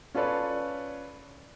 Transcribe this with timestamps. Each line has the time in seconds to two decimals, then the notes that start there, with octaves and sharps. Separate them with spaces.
0.15 C#4 F4 A4 B4 C#5 D5